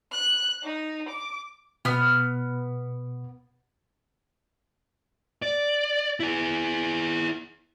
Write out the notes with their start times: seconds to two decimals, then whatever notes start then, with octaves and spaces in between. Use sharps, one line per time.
0.12 F#6
0.63 D#4
1.09 D6
1.85 B2 B3 F6
5.42 D5
6.20 E4 G#4